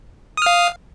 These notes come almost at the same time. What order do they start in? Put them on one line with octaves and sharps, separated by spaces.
D#6 F6 F5